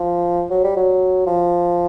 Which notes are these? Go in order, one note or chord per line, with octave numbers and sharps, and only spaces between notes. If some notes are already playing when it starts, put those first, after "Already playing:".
Already playing: F3
F#3
G3
F#3
F3